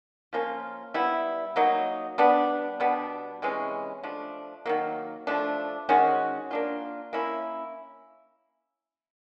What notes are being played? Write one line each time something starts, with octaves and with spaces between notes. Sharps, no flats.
F3 A#3 C#4 F4
G3 B3 E4
F#3 A#3 D#4
G3 B3 D4
B2 G3 B3 D4
C3 E3 G#3 C#4
F3 A3 D4
D#3 F#3 A#3
F3 A3 D4
D#3 G#3 C#4 F#4
A#3 D4 F4
A#3 C#4 E4